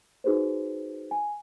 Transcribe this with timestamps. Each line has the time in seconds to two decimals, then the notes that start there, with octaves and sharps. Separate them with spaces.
0.24 D#4 F#4 G#4 B4 C5
1.11 G#5